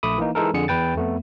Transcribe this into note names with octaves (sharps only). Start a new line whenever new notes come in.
A#1 A3 B5 D6 D#6
E3 A#3 D#4
E3 G#3 D#4 A4 A#4
F2 D3 G#4 C#7
E2 B4 G5 A6
F2 A3 B3